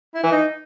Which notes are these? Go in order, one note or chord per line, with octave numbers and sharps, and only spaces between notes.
E4
E3
D#4